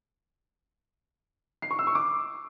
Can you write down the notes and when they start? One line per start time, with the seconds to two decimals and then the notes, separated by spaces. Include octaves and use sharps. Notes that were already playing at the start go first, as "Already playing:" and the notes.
1.62 C7
1.71 C#6
1.79 E6
1.87 C#6
1.95 D6